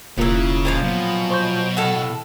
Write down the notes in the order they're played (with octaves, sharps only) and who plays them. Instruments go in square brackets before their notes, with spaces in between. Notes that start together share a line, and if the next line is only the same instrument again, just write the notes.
[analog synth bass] E1 [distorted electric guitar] C#3 [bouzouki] E3 F3 [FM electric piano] A#3 F4 A#4
[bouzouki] A#2 F3 F5
[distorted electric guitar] B2 [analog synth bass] F#3
[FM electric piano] C5 C#6 G6
[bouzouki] A2 A4 F5 [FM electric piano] F#5